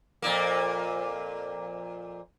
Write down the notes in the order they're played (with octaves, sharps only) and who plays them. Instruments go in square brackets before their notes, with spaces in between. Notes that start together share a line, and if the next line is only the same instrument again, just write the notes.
[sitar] F2 A#2 A#3